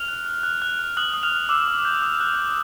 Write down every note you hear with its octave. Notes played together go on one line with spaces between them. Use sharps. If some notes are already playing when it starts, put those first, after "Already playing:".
Already playing: F6 F7
F#6
F#6
F#6
F#6
F#6
D#6 F#6 F#7
D#6
F6 F7
D#6
D6 E6 E7
D6
G6
D#6
F#6
F#6